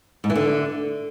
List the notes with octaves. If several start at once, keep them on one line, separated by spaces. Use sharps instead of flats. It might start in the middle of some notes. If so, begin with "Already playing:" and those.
G#2
E3
D3